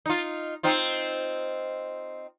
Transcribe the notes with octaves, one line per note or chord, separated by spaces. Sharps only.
D#4 F4
C4 D#4 F4